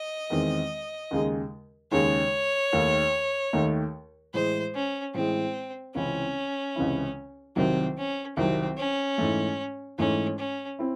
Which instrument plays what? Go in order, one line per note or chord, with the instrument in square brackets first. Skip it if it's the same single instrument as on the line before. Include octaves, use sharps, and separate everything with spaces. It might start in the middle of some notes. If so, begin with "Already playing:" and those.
Already playing: [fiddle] D#5
[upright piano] E2 D#3 G#3 C4
D#2 C#3 G#3 D#4 G#4
[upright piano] D#2 C#3 G#3 D#4 G#4 [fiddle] C#5
[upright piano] D#2 D#3 A3 D#4
D#2 D#3 A3 D#4
[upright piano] A2 E3 G#3 [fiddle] C5
[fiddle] C#4
[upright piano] A2 E3 G#3 [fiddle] C4
[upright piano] C#2 C3 E3 C4 E4 [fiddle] C#4
[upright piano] C#2 C3 E3 C4 E4
[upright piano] C2 C3 D#3 F#3 [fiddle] C4
[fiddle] C#4
[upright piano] C2 C3 D#3 F#3 [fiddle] C4
[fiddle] C#4
[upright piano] G#2 E3 A3
[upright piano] G#2 E3 A3 [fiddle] C#4
[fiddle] C#4
[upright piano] C4 E4